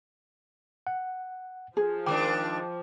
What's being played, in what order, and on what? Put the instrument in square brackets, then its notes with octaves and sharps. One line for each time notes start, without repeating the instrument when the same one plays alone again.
[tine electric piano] F#5
[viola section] F3 [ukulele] G#4
[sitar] D#3 G#3 D4 [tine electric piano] G5 D6